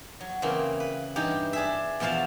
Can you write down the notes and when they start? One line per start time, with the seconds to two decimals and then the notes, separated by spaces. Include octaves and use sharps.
0.21 F#3
0.42 C#3 E3 A#3 C4
0.80 B4
1.16 G2 E3 D#4 G4
1.53 D4 G#4 E5
2.00 E2 B2 F3 E4 F5 A5